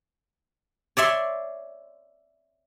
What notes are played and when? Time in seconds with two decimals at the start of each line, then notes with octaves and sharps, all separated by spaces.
0.97 C#5 D5 E5 C6